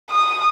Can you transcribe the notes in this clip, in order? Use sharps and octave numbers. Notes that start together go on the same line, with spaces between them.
D#6